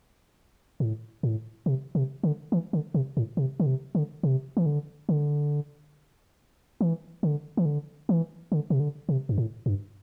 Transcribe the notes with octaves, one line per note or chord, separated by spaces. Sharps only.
A2
A2
C3
C3
D3
E3
D3
C3
A2
C3
D3
C3
D3
C3
E3
D3
D3
E3
D3
E3
D3
E3
D3
C3
D3
C3
G2
A2
G2